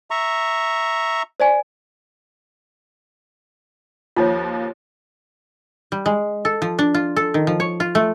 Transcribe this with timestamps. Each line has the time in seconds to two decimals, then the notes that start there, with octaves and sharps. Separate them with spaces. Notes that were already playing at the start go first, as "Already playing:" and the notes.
0.11 E5 A#5 C#6
1.40 C5 D5 G#5
4.16 D#2 F3 F4 C#5
5.92 G3
6.06 G#3
6.45 A4
6.62 F3
6.79 D4
6.94 F4
7.16 A4
7.34 D#3
7.47 F3
7.60 C#5
7.80 F4
7.95 A3